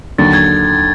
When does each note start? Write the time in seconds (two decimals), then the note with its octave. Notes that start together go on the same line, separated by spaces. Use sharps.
0.18 D#2 D3 F#3 A6
0.33 G#6